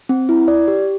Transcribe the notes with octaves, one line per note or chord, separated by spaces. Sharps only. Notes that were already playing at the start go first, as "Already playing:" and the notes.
C4
E4
D5
G4